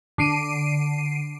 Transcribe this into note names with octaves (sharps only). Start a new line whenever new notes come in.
D3 C7 D7 D#7